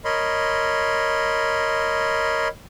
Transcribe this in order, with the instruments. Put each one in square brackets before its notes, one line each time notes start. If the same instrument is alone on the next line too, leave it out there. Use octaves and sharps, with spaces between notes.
[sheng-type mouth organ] A#4 C#5 D#5 B5 C6